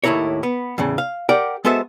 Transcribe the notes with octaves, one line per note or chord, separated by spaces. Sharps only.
D#2 A2 F3 E4 A#4 C#5
B3
E2 A2 C#3
F5
G4 A#4 D5 F#5 G5
G#3 B3 F#4 A4 C5 E5